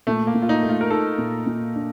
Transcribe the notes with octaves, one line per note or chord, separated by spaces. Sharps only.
A#2 A3
A#3
A#2
F4
D#4
A3
F4
A#4
D#4 A4
A#2
A#2
D4